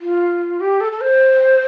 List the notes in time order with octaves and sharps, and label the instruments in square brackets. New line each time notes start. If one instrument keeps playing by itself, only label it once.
[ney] F4
G4
A4
A4
C5